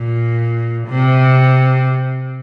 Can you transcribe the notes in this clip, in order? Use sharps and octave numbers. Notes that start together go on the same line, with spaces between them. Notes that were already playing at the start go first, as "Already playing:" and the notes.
Already playing: A#2
C3